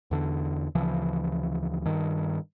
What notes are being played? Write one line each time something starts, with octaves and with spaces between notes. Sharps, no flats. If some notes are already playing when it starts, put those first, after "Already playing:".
E2 D3
D2 C#3 E3 F3
G2 D#3